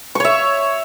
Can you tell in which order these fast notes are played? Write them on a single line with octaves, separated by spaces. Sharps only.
C#6 C#5 E5